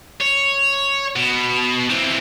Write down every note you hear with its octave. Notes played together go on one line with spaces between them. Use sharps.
C#5
B2
E3 C4